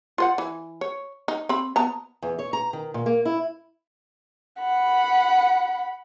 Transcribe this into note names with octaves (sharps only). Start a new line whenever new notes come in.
F4 C5 F#5
E3
C#5
D#4
C4 B5
B3 A5 A#5
E2
C#5
A#5
D#3
A#2
A#3
E4
F#5 B5